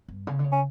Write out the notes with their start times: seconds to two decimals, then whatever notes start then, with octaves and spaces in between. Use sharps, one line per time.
0.08 G2
0.27 C#3
0.39 D3
0.44 C#3
0.52 C#4